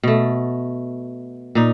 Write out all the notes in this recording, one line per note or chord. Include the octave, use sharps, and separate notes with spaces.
B2 A3
A#2 D#4